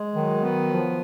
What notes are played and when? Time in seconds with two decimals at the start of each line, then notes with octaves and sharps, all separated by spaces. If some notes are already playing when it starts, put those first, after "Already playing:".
Already playing: G#3
0.14 D#3 F#3
0.42 B3
0.69 F3